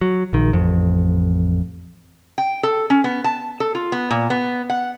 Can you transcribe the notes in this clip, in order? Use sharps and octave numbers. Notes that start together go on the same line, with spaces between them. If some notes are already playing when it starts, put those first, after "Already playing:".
F#3
A#1 D#3
A1 F2
G5
A4
C#4
B3
A5
A4
F4
B3
A#2
B3
F#5